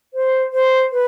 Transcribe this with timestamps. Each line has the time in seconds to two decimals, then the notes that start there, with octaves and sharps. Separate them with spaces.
0.14 C5
0.53 C5
0.92 B4